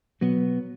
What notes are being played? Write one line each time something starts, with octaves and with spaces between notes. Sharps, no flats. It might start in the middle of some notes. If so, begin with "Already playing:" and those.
B2 F#3 B3